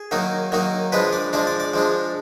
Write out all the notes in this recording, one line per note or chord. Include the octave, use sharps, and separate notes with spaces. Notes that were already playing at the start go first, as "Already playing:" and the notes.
Already playing: G#4
D#3 F#3 A#3 D#4
D#3 F#3 A#3 D#4
F3 G#3 D4 B4
D5
F3 G#3 D4 D5
D5
D5
F3 G#3 D4